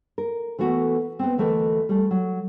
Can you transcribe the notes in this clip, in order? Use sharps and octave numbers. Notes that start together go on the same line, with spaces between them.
A#4
E3 A3 B3 F#4
B3 C4
D2 E3 A3 A#4 D#5
G3 A3
F#3